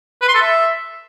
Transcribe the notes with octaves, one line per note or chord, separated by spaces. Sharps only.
B4
C6
A4
E5